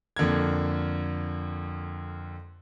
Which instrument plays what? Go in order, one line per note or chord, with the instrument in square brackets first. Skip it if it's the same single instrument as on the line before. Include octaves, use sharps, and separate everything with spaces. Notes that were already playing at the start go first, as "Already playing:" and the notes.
[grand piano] F2 D3 A#3 G#6